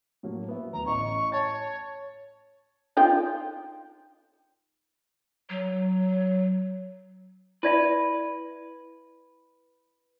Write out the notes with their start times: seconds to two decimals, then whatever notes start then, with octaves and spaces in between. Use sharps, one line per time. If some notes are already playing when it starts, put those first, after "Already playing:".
0.23 A2 F#3 A#3
0.48 B3 E5
0.73 D2 A#5
0.85 A1 D#5 C#6
1.32 C#5 A5 A6
2.97 D#4 F4 G5
5.50 F#3
7.63 E4 B4 D5 E5